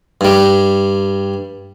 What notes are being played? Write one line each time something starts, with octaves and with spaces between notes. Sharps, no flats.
G2 G3